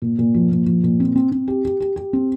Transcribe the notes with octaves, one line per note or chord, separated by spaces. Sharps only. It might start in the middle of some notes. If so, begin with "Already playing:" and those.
A#2
A#2
F3
A#2
F3
A#2
C4
C4
C4
G4
G4
G4
G4
C4